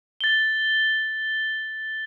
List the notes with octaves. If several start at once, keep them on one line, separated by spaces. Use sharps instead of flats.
A6 G7